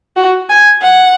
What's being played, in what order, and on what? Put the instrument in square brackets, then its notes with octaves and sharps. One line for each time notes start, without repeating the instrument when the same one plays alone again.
[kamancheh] F#4
G#5
F#5